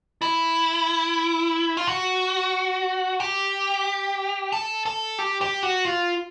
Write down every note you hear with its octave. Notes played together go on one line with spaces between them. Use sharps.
E4
F4
F#4
G4
A4
A4
G4
G4
F#4
F4